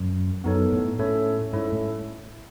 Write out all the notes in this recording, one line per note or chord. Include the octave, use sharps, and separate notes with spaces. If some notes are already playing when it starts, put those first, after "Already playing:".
Already playing: F#2
F#2 B3 D#4 A4 C#5
A2
A2 C#4 E4 A4 C#5 E5
G#2 C#4 E4 A4 C#5 E5
A2